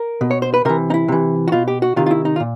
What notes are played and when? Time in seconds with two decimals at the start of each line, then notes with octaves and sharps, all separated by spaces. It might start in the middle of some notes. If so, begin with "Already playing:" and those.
Already playing: A#4
0.21 B2
0.31 C#5
0.42 C5
0.54 B4
0.65 C3 E3 A#4
0.90 D#4
0.94 E4
1.08 C3 E3
1.48 F#4
1.52 B2 F4
1.68 G4
1.82 F#4
1.96 C3 D#3 F4
2.06 F4
2.11 E4
2.25 D#4
2.36 F4
2.40 A#2